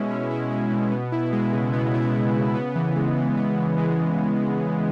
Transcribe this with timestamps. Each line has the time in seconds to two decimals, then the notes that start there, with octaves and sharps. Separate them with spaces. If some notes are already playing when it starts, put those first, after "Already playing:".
Already playing: B2 G#3 C#4 E4
0.11 C#4
0.31 E4
0.51 G#3
0.72 B2
0.92 B3
1.12 E4
1.33 G#3
1.53 C#3
1.73 B3
1.94 E4
2.14 G#3
2.35 C#3
2.55 B3
2.76 E3
2.96 G#3
3.17 E3
3.37 B3
3.57 E3
3.78 G#3
3.98 E3